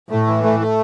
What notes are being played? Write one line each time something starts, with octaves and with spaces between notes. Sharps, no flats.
A2 A3
E3
A3
A3